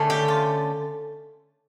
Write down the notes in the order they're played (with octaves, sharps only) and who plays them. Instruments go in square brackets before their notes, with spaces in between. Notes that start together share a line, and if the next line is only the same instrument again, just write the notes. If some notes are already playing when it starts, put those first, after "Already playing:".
Already playing: [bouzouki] D3 A3 C#4
G4
F4